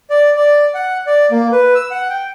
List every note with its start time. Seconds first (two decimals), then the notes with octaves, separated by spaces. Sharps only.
0.10 D5
0.36 D5
0.74 F#5
1.07 D5
1.31 A#3
1.52 B4
1.75 E6
1.91 F#5
2.10 G5